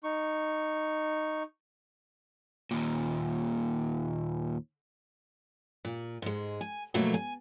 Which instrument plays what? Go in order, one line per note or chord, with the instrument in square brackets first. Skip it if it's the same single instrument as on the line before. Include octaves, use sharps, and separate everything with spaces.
[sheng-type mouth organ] D#4 C#6
[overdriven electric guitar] D#2 A#2
[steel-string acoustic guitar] A#2
G#2 G#3
G#5
B2 F3 F#3 A3 A#3
G#5